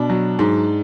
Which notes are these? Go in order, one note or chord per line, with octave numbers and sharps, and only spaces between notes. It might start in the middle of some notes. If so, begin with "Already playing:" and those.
Already playing: B2 D4
F#3
G#2